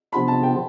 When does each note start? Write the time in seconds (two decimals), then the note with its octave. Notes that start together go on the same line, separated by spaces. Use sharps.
0.13 C3 F3 B3 D4 F4 B5
0.28 A5
0.43 G5